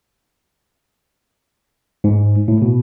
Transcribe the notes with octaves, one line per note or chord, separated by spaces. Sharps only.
G#2
A2
B2